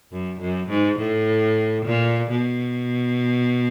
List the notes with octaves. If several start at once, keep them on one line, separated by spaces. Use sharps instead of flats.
F#2
F#2
G#2
A2
A#2
B2